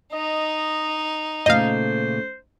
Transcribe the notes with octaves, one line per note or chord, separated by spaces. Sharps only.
D#4 D#5
A#2 C#3 A3 C5 D#5 F5